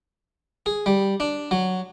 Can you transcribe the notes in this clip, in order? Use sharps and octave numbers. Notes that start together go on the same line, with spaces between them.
G#4
G3
D4
F#3